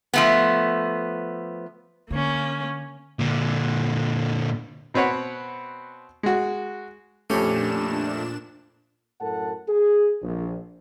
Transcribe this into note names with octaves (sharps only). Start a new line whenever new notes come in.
F3 A3 B3
D3 A#3 C#4
A#2 D3
B2 C4 B4 C#5 F#5
G#3 F#4
F2 A#2 A3 C#4 D4 G4 E7
F#2 A2 A4 A#4 F#5 A5
G#4
A#1